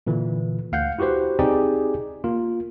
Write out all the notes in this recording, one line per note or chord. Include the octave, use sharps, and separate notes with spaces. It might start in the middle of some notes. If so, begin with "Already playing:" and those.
A#2 D3 E3
D2 F5 F#5 G6
E4 F#4 G4 B4 C5
C4 D#4 G4 G#4 D5 G#5
A#3 F4